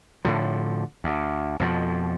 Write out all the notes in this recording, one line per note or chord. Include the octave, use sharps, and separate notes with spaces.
A2 D3 F3
D2
F2 B2 F3